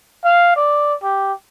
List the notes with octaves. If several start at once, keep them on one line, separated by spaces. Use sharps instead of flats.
F5
D5
G4